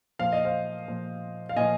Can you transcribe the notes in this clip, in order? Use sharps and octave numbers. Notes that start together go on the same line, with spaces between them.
A#2 F3 F5
D#5
C5 F5
A#2 F3
F5
A#2 F3 D#5 G#5